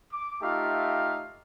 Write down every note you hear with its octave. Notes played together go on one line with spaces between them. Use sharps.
D6
A3 D#4 F4 G4 E5 F5